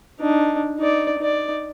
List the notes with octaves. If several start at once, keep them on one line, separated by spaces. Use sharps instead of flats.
D4 D#4
D#4 D5
D#4 D5